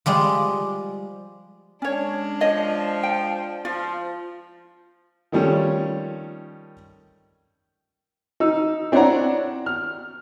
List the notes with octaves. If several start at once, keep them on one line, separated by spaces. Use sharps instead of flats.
F3 G3 G#3
G#3 C#4 D4 C#5
F3 C#5 D#5
G5
F3 F4
D#3 F3 G3 A3 C#4
D#4 E6
C4 D4 E4 C#5 F#5 A#5
F6